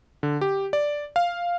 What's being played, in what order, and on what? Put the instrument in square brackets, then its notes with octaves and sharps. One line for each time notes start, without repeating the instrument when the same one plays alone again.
[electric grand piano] D3
G4
D5
F5